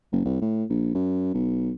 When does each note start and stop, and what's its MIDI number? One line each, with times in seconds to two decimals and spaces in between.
0.12 0.23 30
0.25 0.36 36
0.41 0.64 45
0.69 0.90 34
0.95 1.31 42
1.34 1.72 35